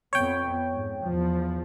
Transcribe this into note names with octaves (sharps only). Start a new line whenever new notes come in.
F2 B3 C#5 G5
G#2
E2 F3